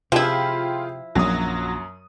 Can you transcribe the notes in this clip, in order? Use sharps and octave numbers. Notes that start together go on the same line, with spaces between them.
C3 F3 E4 F4 G#4 G5
A#1 F#2 F#3 D#6